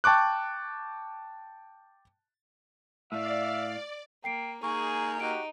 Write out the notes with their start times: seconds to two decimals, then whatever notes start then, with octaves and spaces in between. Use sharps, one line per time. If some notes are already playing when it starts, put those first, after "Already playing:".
0.04 G5 A5 C#6 D6 F#6
3.12 A2 D5 E5 F5
4.24 A#3 G5 C7 D7
4.63 A#3 D#4 G#4 G#5 C#6
5.20 D#4 F#4 G4 D7